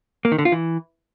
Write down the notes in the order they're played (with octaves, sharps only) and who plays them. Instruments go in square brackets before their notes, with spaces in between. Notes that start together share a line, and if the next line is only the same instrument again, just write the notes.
[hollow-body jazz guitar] A#3
D#3
D3
F4
E3